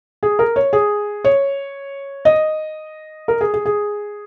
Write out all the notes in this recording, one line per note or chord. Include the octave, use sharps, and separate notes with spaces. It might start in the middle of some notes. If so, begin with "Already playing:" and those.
G#4
A#4
C#5
G#4
C#5
D#5
A#4
G#4
G#4
G#4